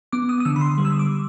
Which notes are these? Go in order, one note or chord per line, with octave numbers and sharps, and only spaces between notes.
B3 D6
D#6
D#6
D3 E6
B5
C6
G3
E6
D#6
D6